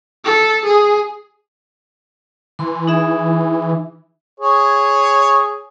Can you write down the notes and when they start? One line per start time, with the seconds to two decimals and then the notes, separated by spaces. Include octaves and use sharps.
0.24 A4
0.65 G#4
2.59 E3 C6
2.87 D#4 G#4 E5
4.40 G#4 C#5